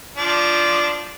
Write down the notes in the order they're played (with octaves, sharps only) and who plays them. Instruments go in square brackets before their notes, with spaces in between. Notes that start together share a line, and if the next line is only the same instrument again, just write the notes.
[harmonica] F3 D4